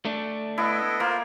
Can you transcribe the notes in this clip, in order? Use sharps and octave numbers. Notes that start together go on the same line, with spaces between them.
A3 D4
B3 E4 A4 D#5
A#3 F4 A#4 C5